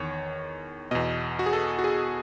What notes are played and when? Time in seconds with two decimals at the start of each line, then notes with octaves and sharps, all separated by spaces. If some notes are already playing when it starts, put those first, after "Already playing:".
Already playing: E2 D#3 C#5
0.91 E2 B2 D#5
1.39 F#4
1.46 G#4
1.53 A4
1.79 F#4
1.84 G#4